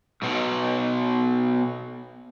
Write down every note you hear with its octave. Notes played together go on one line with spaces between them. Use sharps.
B1 B2